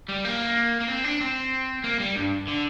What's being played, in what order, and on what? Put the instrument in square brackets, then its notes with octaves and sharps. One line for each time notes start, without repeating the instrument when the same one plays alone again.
[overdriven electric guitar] G3
A#3
A#3
C4
D4
C4
A#3
G3
G2
D3